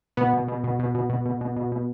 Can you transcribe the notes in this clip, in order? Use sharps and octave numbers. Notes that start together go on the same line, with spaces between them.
B2 B3
B2
B2
B2
B2
B2
B2
B2
B2
B2
B2